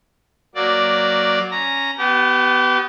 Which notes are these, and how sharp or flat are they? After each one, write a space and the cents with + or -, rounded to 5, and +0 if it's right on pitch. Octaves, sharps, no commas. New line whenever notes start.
F#3 +0 A#3 +0 D5 +0
C#4 +0 A#5 -5
B3 +10 G4 -30